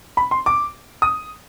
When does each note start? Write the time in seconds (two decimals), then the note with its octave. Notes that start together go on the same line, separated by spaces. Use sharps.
0.17 B5
0.31 C6
0.46 D6
1.02 D#6